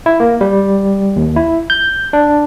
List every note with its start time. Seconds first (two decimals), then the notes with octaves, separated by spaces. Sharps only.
0.06 E4
0.20 A#3
0.41 G3
1.16 D#2
1.36 E4
1.70 G6
2.13 D4